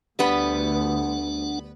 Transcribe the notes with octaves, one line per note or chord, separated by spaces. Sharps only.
D2 G3 B3 D4 B4 F#5